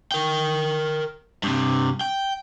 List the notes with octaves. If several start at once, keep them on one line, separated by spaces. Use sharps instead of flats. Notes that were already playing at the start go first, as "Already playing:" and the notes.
A#4 G5
G2 C3
G5